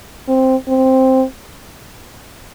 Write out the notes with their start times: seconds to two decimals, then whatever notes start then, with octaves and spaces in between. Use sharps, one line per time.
0.28 C4
0.68 C4